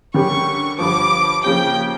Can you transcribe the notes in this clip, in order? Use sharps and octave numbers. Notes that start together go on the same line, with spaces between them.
D3 G3 C#4 G4 A#4 C#6
G1 G2 F3 D6
C#3 F3 A#3 C#4 G4 G5